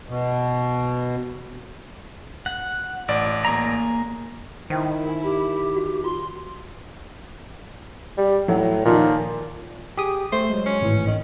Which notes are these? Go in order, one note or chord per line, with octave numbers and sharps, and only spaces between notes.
B2
F#5
A1 D5
A#3 G#4 A#5
D#3 E4 C5 G5
A#4 G#5
G4
F#4
F4 C6
G3
A2 F#3
A#2 D#3 F3
G4 G#4 D#6
A3 C5
F#3 G#3
C#4
G#1 A2 E3
D#3